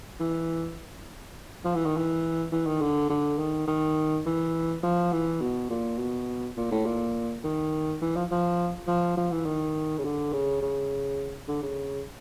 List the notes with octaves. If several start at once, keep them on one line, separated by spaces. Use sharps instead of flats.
E3
F3
E3
D#3
E3
E3
D#3
D3
D3
D#3
D#3
E3
F3
E3
B2
A#2
B2
A#2
A2
A#2
D#3
E3
F3
F3
F3
F3
E3
D#3
C#3
D3
C#3
C#3
D3
C#3